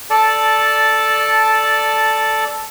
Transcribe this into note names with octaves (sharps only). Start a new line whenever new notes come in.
A4 D5 A5